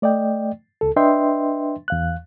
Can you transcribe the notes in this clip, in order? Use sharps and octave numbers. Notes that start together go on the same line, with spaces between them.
A3 D5 D#5 G5
C#2 A4
D4 B4 D#5 E5 G5 C6
E2 F5 F#6